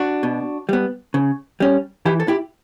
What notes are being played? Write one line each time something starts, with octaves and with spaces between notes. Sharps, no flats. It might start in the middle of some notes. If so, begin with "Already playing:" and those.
Already playing: D4 F#4
B2
G3 B3
C#3
G3 C#4
E3 E4 G4
A4
E4 G4